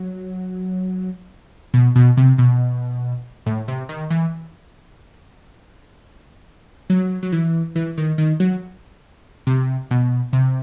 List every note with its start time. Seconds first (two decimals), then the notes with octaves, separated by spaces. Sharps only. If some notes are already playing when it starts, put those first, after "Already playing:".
Already playing: F#3
1.74 B2
1.96 B2
2.17 C3
2.38 B2
3.46 A2
3.68 C3
3.89 D#3
4.10 E3
6.90 F#3
7.23 F#3
7.32 E3
7.75 E3
7.98 D#3
8.18 D#3
8.40 F#3
9.47 C3
9.91 B2
10.33 C3